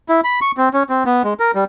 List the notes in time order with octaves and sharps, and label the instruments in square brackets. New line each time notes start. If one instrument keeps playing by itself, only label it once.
[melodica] E4
B5
C#6
C4
C#4
C4
B3
G#3
A#4
G3